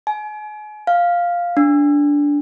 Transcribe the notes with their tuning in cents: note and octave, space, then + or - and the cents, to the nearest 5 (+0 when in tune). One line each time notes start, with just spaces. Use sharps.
G#5 +35
F5 +0
D4 -15